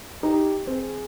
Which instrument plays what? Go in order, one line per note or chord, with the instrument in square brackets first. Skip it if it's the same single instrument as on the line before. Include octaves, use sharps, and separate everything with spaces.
[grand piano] D#4 [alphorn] G4
[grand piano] C4 [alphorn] G#4